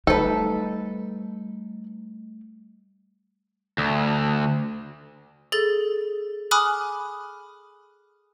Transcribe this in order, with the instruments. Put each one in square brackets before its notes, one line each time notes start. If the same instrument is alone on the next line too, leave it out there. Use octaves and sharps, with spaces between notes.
[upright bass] G3 A3 [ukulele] D#4 B4 [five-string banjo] A4
[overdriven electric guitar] D2
[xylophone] G#4 A4 A6
G#5 B5 D6 D#6 F6 F#6